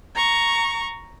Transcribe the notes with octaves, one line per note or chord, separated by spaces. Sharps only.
A#5 C#6